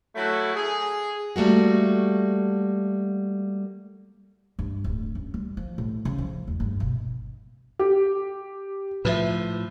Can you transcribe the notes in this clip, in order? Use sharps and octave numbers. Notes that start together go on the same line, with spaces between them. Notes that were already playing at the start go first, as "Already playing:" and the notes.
F#3 A3 E4
G#4
G3 A3 A#3 F#4
G2
D1
F#2
G3
F3
A2
C#3
F3
E2
G1
B2
G4
A2 F3 B4 E5